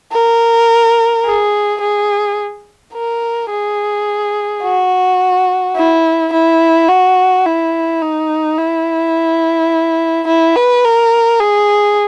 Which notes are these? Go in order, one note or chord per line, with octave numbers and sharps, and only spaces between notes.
A#4
G#4
G#4
A#4
G#4
F#4
E4
E4
F#4
E4
D#4
E4
E4
B4
A#4
G#4